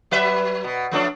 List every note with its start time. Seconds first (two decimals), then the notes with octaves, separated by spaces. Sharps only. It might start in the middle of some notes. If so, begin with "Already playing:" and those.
0.11 F#3 B4 E5
0.64 B2
0.91 F3 A3 D4